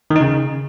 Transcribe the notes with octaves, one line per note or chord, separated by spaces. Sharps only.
D#3
D#4
C#3